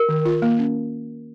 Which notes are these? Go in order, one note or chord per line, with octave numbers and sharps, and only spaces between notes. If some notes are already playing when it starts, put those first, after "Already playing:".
Already playing: A#4
D#3
F4
A#3
C#4